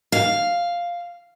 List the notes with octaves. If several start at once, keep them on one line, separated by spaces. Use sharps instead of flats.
F5